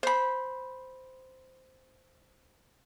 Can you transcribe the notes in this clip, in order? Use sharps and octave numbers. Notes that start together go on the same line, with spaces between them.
C5 B5